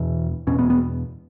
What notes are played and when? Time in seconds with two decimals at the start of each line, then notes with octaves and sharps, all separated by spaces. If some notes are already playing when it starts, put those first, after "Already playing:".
Already playing: E2 B2 E3
0.47 E2 B2 C#4
0.59 B3
0.70 B3